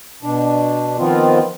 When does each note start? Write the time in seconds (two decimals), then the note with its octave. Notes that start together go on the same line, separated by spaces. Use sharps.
0.23 B2 D4
0.99 D#3 F3 B3 C4 F4